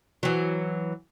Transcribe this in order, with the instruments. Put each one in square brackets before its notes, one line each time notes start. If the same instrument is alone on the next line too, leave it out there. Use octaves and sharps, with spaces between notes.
[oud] E3 F#3